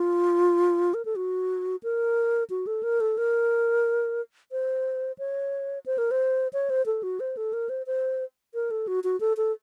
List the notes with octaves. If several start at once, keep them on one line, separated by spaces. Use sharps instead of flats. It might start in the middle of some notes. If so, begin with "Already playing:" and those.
Already playing: F4
A#4
A4
F#4
A#4
F#4
A4
A#4
A4
A#4
C5
C#5
C5
A#4
C5
C#5
C5
A4
F#4
C5
A4
A#4
C5
C5
A#4
A4
F#4
F#4
A4
A4